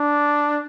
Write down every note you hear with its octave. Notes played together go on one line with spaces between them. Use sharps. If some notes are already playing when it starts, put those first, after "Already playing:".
Already playing: D4